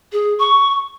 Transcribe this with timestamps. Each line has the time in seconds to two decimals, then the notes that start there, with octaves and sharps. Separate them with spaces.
0.12 G#4
0.39 C#6